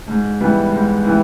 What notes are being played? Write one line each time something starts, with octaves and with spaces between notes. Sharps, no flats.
G#2
E3 G3 B3
G#2
E3 G3 B3